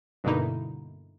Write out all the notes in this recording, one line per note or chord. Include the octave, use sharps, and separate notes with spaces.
G2 B2 D3 A#3 D#4 E4